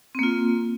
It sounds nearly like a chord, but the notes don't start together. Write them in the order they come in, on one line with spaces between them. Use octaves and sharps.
C4 A#3 F4